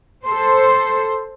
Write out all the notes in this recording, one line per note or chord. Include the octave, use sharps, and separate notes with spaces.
A4 C5 C6